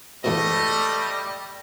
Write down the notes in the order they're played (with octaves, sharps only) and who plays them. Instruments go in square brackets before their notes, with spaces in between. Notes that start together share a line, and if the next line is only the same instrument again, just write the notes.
[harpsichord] E2 G#2 B2 [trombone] G3 [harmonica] A3 [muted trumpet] D#5